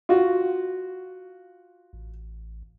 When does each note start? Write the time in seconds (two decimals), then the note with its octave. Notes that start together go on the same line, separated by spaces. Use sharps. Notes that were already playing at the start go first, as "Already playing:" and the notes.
0.09 F4 F#4
1.93 A1